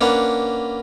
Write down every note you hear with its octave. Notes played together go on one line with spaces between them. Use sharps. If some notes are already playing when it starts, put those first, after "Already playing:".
A#3 C#4 D4 B4 F#5